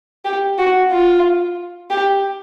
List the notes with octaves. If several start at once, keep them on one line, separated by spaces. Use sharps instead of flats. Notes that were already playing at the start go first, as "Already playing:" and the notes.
G4
F#4
F4
G4